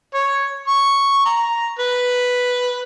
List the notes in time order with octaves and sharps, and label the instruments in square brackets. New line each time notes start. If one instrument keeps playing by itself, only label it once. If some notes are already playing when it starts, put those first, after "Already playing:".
[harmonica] C#5
C#6
A#5
B4